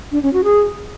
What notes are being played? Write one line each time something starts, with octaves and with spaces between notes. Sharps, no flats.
D4
C#4
F#4
G#4